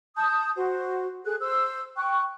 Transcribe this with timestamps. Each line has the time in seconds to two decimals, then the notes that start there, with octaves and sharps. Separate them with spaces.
0.16 A5 D#6 G6
0.57 F#4 C5
1.25 G#4 A4 F#6
1.40 C5 E6
1.96 G5 C#6 F#6